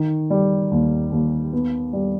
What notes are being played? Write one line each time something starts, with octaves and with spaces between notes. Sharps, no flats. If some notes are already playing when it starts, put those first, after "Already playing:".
Already playing: D#3
G3
D#2
D#2
B3
G3